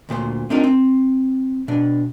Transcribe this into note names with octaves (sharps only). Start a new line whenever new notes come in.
D2 A#2 G4 C5
C4 D4 D#4 F4 A#4
C4
B2 D4